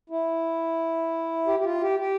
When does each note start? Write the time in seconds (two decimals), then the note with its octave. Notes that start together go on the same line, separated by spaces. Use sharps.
0.10 E4
1.47 G4
1.60 G4
1.64 F4
1.82 G4
1.99 G4